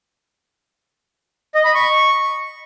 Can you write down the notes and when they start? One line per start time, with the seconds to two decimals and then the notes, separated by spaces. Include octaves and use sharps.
1.55 D#5
1.65 B5
1.75 C#6